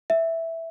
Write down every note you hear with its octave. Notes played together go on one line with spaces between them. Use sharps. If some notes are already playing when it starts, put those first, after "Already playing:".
E5